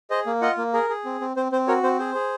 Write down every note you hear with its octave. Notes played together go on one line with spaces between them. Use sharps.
G#4 C5 D#5
A#3
F4 D#5 F#5
A#3
G#4 A#4
G#4
C4
C4
C4 C5
C4 C5
F#4 A#4 C#5
C4 C5
G#4 C5
G#4